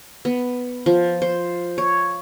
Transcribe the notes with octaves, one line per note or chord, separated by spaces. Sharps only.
B3
F3
C5
C#5